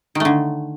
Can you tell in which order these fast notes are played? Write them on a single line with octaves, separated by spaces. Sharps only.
D#3 A3 D3